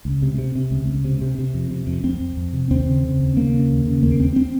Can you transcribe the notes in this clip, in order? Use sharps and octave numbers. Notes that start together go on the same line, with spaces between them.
C#2
C3
C3
C3
C#2
C#2
C3
C3
C3
F2
C3
F2
F2 C4
F2
F2
C3
D#2 C4
C#3
C#3
D#2
C#3 A#3
C#3
D#2
C#3
D#2 A#3
D#2 C4
C4